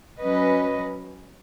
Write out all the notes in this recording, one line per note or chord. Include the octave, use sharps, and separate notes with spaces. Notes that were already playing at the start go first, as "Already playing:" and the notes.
F#3 C#4 B4 D#5